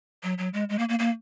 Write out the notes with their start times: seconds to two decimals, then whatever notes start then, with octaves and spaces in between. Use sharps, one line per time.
0.23 F#3
0.38 F#3
0.54 G#3
0.69 G#3
0.79 A#3
0.89 A#3
0.99 A#3